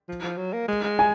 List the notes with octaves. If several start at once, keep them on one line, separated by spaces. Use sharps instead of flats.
F3
F3
F#3
A#3
G#3
G#3
G#5